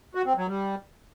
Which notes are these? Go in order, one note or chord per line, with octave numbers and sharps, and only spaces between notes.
F#4
C4
F#3
G3